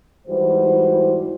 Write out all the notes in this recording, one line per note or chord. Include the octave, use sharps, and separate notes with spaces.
G#2 E3 G3 F#4 C5